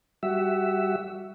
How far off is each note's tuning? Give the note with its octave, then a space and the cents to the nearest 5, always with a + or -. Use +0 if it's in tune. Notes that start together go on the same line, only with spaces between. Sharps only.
G3 +0 F#4 +15 E5 +0